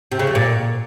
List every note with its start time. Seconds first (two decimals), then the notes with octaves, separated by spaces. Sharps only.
0.12 C3
0.19 C#3
0.27 F2
0.35 A#2